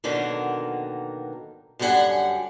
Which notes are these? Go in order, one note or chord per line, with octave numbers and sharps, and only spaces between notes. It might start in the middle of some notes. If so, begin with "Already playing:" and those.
B2 D3 D#3 F#3 A#3
F#2 D3 G3 D#4 F#5 G#5